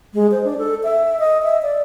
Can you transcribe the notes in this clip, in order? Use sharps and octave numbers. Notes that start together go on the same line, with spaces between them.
G#3
C5
D4
A4
E5
D#5
E5
D5